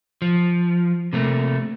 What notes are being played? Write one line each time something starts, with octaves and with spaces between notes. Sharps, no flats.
F3
C3 A3 A#3